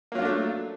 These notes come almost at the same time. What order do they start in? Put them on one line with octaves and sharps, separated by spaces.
A#3 F#3 F4 D4 A3